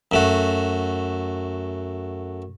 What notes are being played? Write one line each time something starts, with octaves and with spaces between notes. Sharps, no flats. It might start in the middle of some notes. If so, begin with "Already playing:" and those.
F#2 A3 F#4